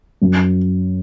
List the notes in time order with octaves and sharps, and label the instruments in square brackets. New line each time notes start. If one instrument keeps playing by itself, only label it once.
[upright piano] F#2